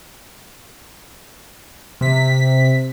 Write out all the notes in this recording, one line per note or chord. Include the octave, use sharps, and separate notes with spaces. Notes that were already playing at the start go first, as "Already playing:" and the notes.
C3 B6